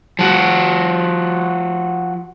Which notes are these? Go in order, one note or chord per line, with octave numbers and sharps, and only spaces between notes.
F3 F#4